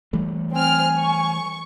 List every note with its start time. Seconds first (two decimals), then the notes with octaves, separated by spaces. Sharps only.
0.13 E3 G3 A3
0.54 C4 G#5 F6
0.99 C#6